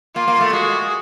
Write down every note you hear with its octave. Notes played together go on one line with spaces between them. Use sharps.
A#3 F4
A#3
A3
G#3 F#4